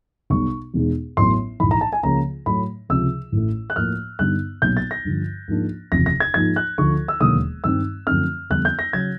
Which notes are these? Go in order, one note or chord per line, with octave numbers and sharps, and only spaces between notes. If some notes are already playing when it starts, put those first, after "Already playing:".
B1 B2 G3 B3 C#6
E2 B2 G#3 B3 D#4
A1 A2 F#3 B3 C6
A#1 G#2 E3 B5
A#5
A5
G#5
C#2 C#3 F3 A#3 A#5
A2 F#3 A3 B5
C#2 C3 F3 E6
A1 A2 E3 A3
F#6
A2 F3 A#3 F6
G2 D3 G3 B3 D#4 F#6
B1 A#2 F#3 B3 G6
A6
A#6
G2 D3 F3
G#2 F3 A#3 D4
F#1 E2 C3 F3 A#6
A#6
G#6
G#2 F3 A#3 D#4 G#6
F#6
D2 D3 F3 C#6
E6
E1 D#2 D3 F#3 A#3 D#6
G2 D#3 G3 C4 D#4 E6
F#2 D3 F3 A3 C4 F6
F2 D3 G3 B3 F#6
G6
A#6
C#3 F#3 G#6